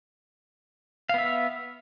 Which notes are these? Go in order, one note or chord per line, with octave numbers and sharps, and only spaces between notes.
B3 E5 F5